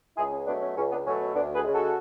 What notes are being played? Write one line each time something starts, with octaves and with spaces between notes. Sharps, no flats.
C#2 E4 G#4
C#4
B2 F#3 A3 B3 D4
C#4
C#2 C#4
B3 D4
B2 F#3 A3 C#4
C#4
D2 B3 D4
G#4 B4
C#3 G#3
F#4 A4